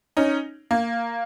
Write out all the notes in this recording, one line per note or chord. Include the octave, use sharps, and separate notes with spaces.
C#4 D#4
A#3